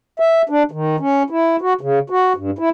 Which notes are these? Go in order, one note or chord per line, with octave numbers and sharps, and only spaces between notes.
E5
D4
D#3
C#4
E4
F#4
C#3
F#4
G2
E4